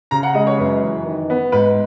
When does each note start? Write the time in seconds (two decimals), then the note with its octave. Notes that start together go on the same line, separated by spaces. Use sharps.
0.11 C#3 A#5
0.23 F#5
0.35 G#3 D#5
0.47 C#5
0.58 F#2 B4
0.82 E3
1.06 D#3
1.30 B3
1.52 G#2 B4